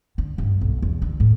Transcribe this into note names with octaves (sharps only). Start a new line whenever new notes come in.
D3
G2
B1
E2
D3
A2